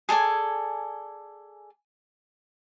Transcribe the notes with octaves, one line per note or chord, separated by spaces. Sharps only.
G#4 A4 D5 G#5